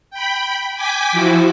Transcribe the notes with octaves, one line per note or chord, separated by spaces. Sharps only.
G5 B5
G5 G#5 D6 B6
F3 E4 F#4